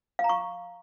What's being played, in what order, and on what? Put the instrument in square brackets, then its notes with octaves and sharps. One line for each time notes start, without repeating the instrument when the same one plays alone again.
[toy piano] F5
A#5
C#6